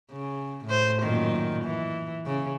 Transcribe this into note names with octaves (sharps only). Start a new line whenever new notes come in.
C#3
A2 C5
F#2 A#2 D#3
E3
C#3